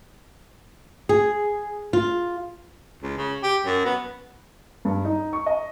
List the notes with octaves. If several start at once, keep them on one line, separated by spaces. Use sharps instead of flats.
G#4
F4
C#2
C#3
G4
F#2
B3
G2
D#4
C#6
D#5